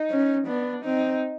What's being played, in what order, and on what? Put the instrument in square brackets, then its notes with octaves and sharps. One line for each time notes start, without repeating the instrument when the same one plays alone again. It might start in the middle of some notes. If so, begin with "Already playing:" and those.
Already playing: [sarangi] D#4
[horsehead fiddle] C#4
[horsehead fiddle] B3 [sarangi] D4
[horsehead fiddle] C4 [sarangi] D#4